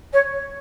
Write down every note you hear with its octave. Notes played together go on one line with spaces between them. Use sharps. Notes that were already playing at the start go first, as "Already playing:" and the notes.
C#5